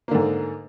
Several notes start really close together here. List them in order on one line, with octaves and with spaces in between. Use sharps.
A#3 D3 G#2